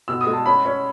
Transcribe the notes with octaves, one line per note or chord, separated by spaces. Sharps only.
B2 E6
D#6
G#3
A5
C#4 B5
C#4